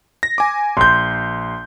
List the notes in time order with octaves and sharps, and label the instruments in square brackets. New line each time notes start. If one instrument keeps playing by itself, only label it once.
[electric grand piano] A#6
G#5 D6
[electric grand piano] A#1 [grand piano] C6 G6